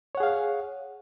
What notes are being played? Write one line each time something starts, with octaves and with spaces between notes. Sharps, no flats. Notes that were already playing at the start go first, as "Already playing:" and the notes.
G#4 C#5 F5 F#5